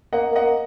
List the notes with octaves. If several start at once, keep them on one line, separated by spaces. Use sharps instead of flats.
A#3 D#5 F#5
A#3 D#5 F#5